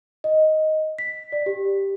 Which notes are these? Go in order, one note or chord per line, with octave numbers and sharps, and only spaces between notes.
D#5
B6
D5
G4